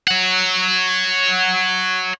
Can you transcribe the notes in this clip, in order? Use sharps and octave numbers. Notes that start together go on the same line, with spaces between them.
C#5 F#5